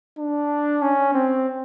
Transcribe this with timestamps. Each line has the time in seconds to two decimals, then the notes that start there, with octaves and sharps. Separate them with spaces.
0.19 D4
0.82 C#4
1.14 C4